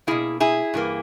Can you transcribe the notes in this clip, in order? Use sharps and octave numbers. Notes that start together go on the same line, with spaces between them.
B2 A#3 E4 G#4
E4 G#4
G2 E3 A#3